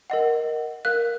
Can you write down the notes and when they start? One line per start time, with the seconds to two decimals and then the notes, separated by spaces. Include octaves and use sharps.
0.10 A#4 D#5 F#5
0.85 A#4 F5 F#6